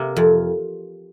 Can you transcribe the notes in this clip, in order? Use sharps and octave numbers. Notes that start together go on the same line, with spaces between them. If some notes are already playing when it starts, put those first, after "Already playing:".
Already playing: C3 A#3
F2